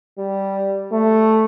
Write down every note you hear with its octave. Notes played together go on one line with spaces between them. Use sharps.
G3
A3